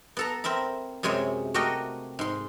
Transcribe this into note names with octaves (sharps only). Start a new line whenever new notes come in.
B3 A4 A#5
C4 A#4 E5 B5
F#2 C3 G#3 G#4 C#5 E5
A3 F#4 G4 A#4 D#5 G5
G#2 C6